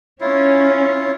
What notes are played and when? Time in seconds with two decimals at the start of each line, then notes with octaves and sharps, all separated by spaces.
0.21 C#4 E4 F4 C#5